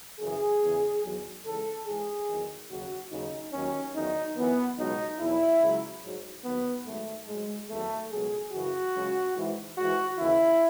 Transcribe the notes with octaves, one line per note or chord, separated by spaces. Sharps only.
F#2 C#3 E3 G#4
E2 C#3 E3
E2 D#3 F#3
C#2 C#3 E3 A4
G#2 E3 G#4
E2 D#3 F#3
D#2 C#3 F#3 F#4
D#2 C#3 F#3 D#4
D#2 D#3 F#3 C#4
E2 D#3 F#3 D#4
F#2 E3 B3
C#2 B2 F#3 D#4
E2 B2 F#3 E4
C#2 C#3 F#3
G#2 F#3
D#2 D#3 F#3 B3
G#2 D#3 F#3 A3
G#2 F#3 G#3
E2 D#3 F#3 A3
C#2 B2 F#3 G#4
F#2 C#3 E3 F#4
C#2 C#3 F#3
G#2 E3
G#2 F#4
E3
D#2 C#3 E3 E4